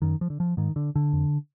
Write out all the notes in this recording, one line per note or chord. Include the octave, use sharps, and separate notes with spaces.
F#2 D#3
F3
D3
F3
G#2 D#3
D3
D3
F2